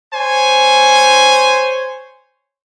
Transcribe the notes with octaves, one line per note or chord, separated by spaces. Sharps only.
C5 C#5 G#5